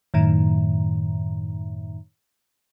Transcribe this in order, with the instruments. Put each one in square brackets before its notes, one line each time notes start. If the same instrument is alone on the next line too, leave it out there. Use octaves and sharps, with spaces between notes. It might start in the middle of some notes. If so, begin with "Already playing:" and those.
[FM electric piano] F#2 A2 D#3